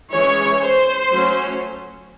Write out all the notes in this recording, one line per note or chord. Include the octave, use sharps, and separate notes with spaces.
E3 G#3 C#4 C#5
C5
F#3 A3 C#4